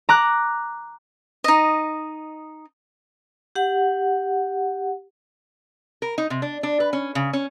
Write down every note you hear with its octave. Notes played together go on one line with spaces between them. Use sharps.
A#5 D6 F#6
D#4 D#5
G4 F#5
A#4
D#4
C3
D4
D4
B4
C#4
C#3
C#4